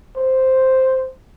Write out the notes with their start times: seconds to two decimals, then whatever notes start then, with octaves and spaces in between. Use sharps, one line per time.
0.16 C5